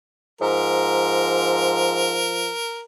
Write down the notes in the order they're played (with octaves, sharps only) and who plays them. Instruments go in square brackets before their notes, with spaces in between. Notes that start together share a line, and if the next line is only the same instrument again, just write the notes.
[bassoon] G#2 [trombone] F3 [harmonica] A#4